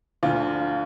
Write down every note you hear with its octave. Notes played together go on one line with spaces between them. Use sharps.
D2 D3 F3 F4